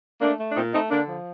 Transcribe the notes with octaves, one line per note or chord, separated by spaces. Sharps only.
A3 A#3 D4
A3
D4
A#2 C4 D#4
A3 C4 D#4
D3 A#3 D4
F3